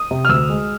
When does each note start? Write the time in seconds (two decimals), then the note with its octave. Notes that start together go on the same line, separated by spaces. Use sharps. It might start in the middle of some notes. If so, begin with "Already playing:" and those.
Already playing: D#6
0.11 C3
0.25 F6
0.29 D2 E6
0.49 G#3